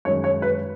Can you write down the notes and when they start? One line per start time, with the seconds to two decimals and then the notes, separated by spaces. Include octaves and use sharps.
0.05 F#2 D#3 G#3 C#5
0.24 C#5
0.42 B4